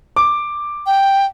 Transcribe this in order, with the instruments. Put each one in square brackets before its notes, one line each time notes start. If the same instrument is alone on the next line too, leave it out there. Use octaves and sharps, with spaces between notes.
[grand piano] D6
[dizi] G5